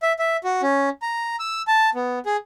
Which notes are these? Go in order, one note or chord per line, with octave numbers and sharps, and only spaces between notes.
E5
E5
F#4
C#4
A#5
E6
A5
B3
G#4